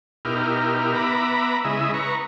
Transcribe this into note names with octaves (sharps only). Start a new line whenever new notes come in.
B2 D#4 E4 G4 A#4 F6
B3 E5 A#5 B5 D6
C#3 G#3 E4 D#5 E5
B4 A#5 C#6